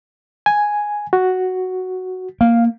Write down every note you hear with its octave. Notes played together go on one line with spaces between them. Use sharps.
G#5
F#4
A#3 F5